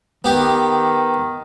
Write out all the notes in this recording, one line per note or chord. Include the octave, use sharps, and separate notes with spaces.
D#3 B3 G4